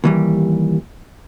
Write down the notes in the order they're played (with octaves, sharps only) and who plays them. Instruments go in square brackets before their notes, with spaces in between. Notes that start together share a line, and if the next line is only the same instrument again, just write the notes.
[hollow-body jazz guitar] D#2 E3 G3